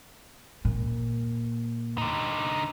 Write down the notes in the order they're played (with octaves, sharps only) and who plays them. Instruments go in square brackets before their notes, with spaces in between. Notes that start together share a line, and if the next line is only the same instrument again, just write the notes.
[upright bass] A#2
[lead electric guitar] D3 D#4